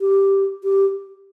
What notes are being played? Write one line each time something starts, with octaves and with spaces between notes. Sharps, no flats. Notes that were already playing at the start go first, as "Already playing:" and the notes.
G4
G4